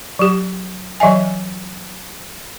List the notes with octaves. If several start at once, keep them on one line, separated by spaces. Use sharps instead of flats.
F#3 G4
E3 F#3 D#5 E5 G#5